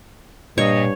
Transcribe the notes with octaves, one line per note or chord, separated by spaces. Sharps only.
G2 A#2 C#5 D#5